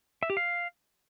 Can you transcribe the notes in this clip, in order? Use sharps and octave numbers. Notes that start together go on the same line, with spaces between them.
E5
G4
F5